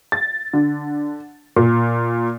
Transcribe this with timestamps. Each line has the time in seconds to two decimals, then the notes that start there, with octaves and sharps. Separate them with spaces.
0.12 A6
0.53 D3
1.56 A#2